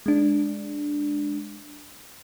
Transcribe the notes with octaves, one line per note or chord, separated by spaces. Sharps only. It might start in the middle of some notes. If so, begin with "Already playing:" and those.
G#3 D4